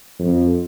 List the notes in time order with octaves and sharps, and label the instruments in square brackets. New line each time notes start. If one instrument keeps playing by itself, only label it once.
[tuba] F2